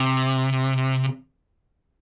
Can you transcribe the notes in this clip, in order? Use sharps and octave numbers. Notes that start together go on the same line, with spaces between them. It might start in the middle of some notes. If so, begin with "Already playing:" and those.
Already playing: C3